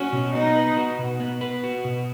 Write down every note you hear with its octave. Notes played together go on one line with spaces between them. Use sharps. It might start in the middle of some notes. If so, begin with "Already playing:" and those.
Already playing: C#4 F#4
B2
B3 D#4
B4
F#4
B2
B3
B4
F#4
B2